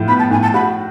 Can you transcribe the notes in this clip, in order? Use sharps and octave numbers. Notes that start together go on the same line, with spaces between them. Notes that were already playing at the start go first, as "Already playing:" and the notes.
Already playing: A2 F3
B3 B5
A5
A2 G#5
A5
F#4 B5